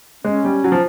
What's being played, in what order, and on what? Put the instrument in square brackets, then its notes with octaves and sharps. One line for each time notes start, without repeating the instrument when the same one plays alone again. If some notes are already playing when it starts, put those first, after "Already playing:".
[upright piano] G#3 [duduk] C#4
[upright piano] G3
F#3
F3